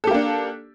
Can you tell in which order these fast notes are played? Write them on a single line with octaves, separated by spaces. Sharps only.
A4 G4 A#3 D4